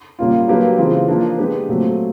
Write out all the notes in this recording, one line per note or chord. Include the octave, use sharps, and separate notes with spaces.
A#2 G3 A#3 C#4 F4
F#3 A#3 D4 G4 B4
C#3 E3 G#3 C4 F4
F3 A#3 D4
G#3 B3 D4 G4 B4
A#2 F#3 A3 C4